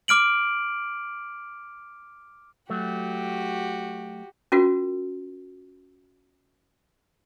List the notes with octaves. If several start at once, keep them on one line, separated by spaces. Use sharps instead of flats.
D6 F6 D7 F#7
F#3 A3 F#4 G4
C#4 F4 F#4 A#4